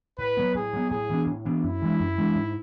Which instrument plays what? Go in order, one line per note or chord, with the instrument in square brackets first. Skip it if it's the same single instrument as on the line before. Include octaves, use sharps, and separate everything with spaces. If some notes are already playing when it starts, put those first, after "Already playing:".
[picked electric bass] A2 [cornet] B4
[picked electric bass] F#3 B3
[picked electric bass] A2 [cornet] G#4
[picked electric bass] F#3 B3
[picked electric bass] A2 [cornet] G#4
[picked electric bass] E3 B3 D4
A2
E3 B3 D4
[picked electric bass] F#2 [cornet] E4
[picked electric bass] E3 G#3 D4
F#2
E3 G#3 D4
G#2